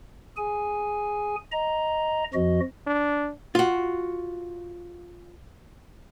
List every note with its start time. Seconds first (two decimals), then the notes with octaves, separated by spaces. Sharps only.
0.37 G#4 G#5
1.52 D#5 A#5
2.34 F2 F3 F#4 D#5
2.87 D4
3.55 F4 F#4